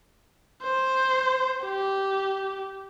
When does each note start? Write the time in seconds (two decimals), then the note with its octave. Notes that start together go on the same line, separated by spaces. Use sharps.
0.63 C5
1.64 G4